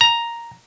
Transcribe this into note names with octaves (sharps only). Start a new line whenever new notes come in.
A#5